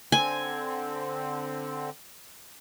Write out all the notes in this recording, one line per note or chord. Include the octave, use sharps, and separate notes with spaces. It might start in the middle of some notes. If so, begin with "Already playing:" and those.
D3 C4 G#5